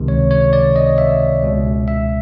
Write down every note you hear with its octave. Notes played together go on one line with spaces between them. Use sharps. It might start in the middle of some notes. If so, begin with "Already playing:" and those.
Already playing: C#2 C3 D#3
C#5
C#5
D5
D#5
E5
C#2 B2
E5